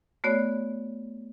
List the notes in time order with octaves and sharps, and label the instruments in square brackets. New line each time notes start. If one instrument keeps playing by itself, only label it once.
[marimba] A3 B3 F#4 C#5 D5